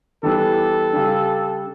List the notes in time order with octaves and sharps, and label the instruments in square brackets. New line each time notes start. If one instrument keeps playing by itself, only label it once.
[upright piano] E3 G3 B3 D4 [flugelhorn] A4
[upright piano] C#3 G3 D4